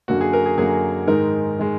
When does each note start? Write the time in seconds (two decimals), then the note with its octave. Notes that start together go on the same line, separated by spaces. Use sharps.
0.08 F#2 D3 F#3 A#3 F#4
0.21 G#4
0.33 A#4
0.46 G#4
0.58 F#2 D3 F#3 A#3 G#4
1.07 G#2 D#3 G#3 A#4
1.59 D#3 G#3